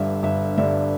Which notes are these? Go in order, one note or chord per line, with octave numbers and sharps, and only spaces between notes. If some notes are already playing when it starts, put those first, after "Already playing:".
Already playing: G1 G2 D3 E5
G1 E5
G2 D3 E5